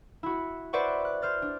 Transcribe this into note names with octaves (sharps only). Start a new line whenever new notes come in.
E4 F#4
B4 C5 D5 E5 F#5 C#6
F#6
C5 F6 A6
D4